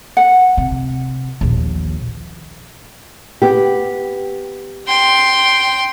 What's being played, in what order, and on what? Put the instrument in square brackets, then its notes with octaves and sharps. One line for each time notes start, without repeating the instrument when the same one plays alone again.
[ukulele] F#5
[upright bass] C3
A#1 D#2
[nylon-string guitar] B3 G4
[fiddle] G5 C6